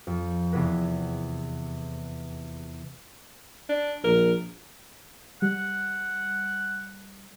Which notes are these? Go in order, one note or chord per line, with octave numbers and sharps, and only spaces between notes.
F2
E2 C3 B3 G#4 B4 A#6
D4
A#1 A#4
G3 F#5